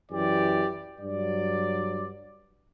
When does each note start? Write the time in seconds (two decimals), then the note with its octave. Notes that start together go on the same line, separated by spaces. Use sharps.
0.11 F#2 E3 G4 D5
1.00 G2 F#3 D5